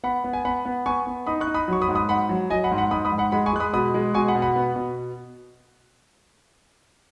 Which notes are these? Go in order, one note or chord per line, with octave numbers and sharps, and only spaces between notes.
B3 F#5 B5
B3
G#5
B3 F#5 B5
B3
B3 G#5 C#6
B3
D#4 B5 D#6
C#6 F#6
D#4
B5 D#6
F#3 C#6
B5 D#6
G#2
B5 D#6
G#2 F#5 B5
F#3
F#3 D#5 G#5
F#5 B5
G#2
F#5 B5
G#2 B5 D#6
B5 D#6
G#2
F#5 B5
G#3 F#5 B5
G#5 C#6
G#3 F#6
B5 D#6
B2 B5 D#6
G#3
B2 G#5 C#6
F#5 B5
B2
F#5 B5
B3
B2